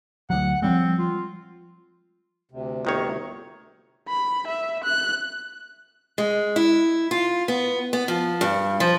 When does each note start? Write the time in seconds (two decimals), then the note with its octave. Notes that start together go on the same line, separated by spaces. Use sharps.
0.30 D2 F#3 F#5
0.62 F3 G3 G#3 C4
0.99 F4
2.51 D2 C3
2.85 G1 D#3 C#5
4.08 B5
4.48 E5
4.84 F#6
6.18 G#3
6.56 E4
7.11 F4
7.48 B3
7.93 B3
8.08 F3
8.41 G2
8.80 F3